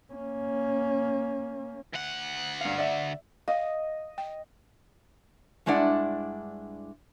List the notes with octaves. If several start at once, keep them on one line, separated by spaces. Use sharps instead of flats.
A#3 C#4
D2 F#5
G2 F5
D5 E5
D#5 F5
G5
G2 G#3 D4 E4 D5 F#5